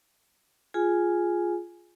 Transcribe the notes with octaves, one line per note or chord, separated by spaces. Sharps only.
F4 G#4 G#5